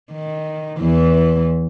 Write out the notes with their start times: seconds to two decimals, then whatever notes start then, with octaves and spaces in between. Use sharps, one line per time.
0.12 D#3
0.80 E2 E3